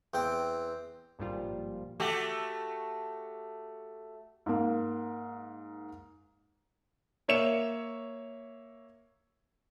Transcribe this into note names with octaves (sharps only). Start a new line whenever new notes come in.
E2 C4 G5
G#1 G2 A#2 F3 G3 F4
A3 F#4 G4
G#2 A#3
A#3 C#5 E5 C#7 E7